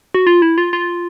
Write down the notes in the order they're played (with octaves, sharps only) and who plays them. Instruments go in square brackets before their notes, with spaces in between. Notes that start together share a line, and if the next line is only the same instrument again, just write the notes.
[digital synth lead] F#4
F4
E4
F4
F4